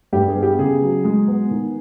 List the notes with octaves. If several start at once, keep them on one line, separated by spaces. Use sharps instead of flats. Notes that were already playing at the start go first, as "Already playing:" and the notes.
G2 G4
G#4
B3
G4
C#3 G#4
F#3
G#3
B3
D#3